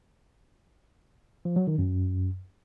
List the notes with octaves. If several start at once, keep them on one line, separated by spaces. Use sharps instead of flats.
F3
F#3
D#3
F#2